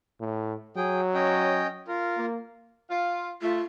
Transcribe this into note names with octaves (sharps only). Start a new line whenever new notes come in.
A2
F#3 G#4 G5
C#4 D#5 G5
F4 A#4
A#3
F4
A3 F4